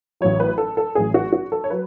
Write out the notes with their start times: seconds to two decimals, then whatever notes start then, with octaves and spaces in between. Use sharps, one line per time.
0.21 A1 A2 F#3 C#5
0.40 B4
0.58 A4
0.77 A4
0.95 A1 A2 F#3 G#4
1.14 F#4
1.33 F#4
1.52 A4
1.64 C#5
1.70 F#3 B4